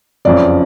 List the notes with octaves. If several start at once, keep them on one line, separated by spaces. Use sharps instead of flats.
F#1 F2 C#3 D5